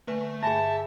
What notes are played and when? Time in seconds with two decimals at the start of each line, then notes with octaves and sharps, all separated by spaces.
0.08 D3 A3 B4 G#5
0.43 G2 G#4 E5 G#5 A5 B5